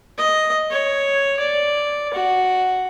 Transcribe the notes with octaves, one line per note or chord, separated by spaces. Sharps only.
D#5
C#5
D5
F#4